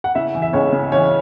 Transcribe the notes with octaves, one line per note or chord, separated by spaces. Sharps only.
F#5
C#3 E4 E5
E3
E5
C#2 C#4 C#5
C#3
E3 C#4 C#5